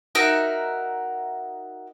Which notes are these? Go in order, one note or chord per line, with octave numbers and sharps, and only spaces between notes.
D#4 F#4 A#4 E5